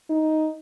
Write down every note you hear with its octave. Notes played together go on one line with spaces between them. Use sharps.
D#4